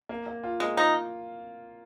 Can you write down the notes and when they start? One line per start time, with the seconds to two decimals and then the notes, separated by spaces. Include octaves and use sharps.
0.09 A#3
0.27 A#3
0.43 F4
0.60 G#3 A#3
0.77 D#4 F4